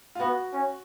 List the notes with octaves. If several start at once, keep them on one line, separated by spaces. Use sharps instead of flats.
F4
B3 F#4
C#4